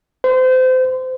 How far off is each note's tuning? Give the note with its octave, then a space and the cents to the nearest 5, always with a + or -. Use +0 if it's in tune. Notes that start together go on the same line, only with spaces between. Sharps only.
C5 -30